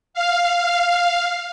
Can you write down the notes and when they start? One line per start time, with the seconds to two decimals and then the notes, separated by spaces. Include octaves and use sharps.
0.14 F5